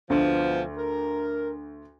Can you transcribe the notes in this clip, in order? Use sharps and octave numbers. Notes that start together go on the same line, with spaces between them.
D2 B2 F3
A#4